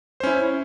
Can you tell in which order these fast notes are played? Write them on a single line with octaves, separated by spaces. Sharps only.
C5 C#4 E4